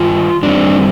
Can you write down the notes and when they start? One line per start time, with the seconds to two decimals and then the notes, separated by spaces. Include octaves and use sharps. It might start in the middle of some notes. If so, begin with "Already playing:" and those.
Already playing: G2 D#3 F4
0.43 G2 D#3 G3 C4 D4